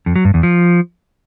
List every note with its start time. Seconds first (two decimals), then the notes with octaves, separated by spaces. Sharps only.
0.06 F2
0.16 F#3
0.25 G2
0.34 E2
0.43 F3